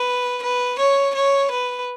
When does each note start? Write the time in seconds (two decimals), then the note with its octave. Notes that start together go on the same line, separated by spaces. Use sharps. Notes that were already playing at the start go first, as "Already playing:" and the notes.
Already playing: B4
0.43 B4
0.79 C#5
1.15 C#5
1.51 B4